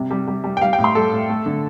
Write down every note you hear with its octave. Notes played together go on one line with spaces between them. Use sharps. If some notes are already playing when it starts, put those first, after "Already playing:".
Already playing: C3 G3
G3
G3
G3
G5
G3 F5
G5
A2
C6
G3 A4
A2
A3
D3